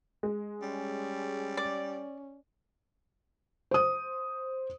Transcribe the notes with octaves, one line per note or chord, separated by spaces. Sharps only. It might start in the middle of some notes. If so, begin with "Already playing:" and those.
G#3
G3 C#4
D5
C5 D#6